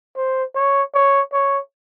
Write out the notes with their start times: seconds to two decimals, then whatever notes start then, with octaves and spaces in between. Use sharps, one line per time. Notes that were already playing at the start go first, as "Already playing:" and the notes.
0.16 C5
0.55 C#5
0.94 C#5
1.33 C#5